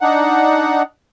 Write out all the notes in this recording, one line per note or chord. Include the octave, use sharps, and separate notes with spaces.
D4 D#4 F#5